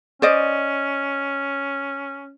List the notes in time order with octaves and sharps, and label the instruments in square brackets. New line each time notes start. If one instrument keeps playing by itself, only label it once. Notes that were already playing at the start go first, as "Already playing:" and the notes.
[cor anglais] C#4 [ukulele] C5 D5 D#5